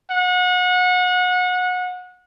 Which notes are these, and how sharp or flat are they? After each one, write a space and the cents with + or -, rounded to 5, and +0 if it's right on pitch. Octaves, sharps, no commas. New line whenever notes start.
F#5 -30